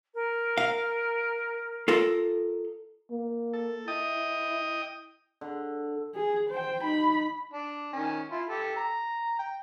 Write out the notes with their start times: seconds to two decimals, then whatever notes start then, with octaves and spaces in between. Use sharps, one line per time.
0.14 A#4
0.58 F5
1.88 F4 A4 A#4
3.11 A#3
3.53 A4
3.88 E4 D#5 G5 D#6
5.41 D3
6.14 G#4
6.50 C5 G5
6.84 D#4 B5
7.53 D4
7.93 D#3 C#4
8.31 E4 F4
8.48 G4 A4
8.76 A#5
9.39 G5